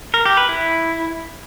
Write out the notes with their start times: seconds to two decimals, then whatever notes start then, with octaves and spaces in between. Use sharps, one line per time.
0.14 A#4
0.26 G4
0.37 B4
0.49 E4